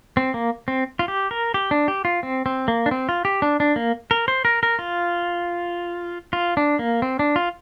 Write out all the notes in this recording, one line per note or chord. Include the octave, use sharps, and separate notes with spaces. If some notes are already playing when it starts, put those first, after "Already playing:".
C4
A#3
C4
F4
G4
A#4
G4
D4
G4
F4
C4
C4
A#3
D4
C4
F4
G4
D4
D4
A#3
A#4
C5
A#4
A#4
F4
F4
D4
A#3
C4
D4
F4